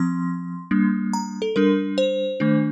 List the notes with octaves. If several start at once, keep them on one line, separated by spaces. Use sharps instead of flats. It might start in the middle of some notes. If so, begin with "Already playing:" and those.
Already playing: F3 C4 C6
G3 A#3 D4
A#5
A4
G3 D4 A#4
C5
D#3 A3 D4